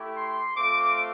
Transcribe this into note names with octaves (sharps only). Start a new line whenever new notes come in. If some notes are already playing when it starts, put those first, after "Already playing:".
Already playing: A3 E4 G4
C6
A3 C4 F4 D6